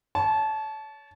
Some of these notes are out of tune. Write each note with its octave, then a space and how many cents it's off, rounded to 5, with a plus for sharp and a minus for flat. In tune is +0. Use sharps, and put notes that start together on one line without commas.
C#5 +25 A5 -20